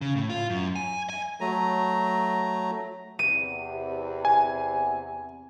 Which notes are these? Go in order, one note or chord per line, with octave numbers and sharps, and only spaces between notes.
C#3
A2
F4
F#2
G#5
G#5
F#3 A3 A#5
E2 C3 D#7
G#5